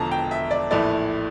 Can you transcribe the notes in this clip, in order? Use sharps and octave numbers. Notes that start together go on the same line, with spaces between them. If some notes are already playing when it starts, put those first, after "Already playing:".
Already playing: E1 E2 D3 F3 A5 A#5
G5
E5
D5
A#1 A2 E3 A3 E4 D5